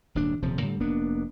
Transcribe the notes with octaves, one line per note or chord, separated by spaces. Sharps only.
D#1 D#2 G#2 D4
D#1 C3 F3
A2 D3 G3
F1 A#3 B3 D4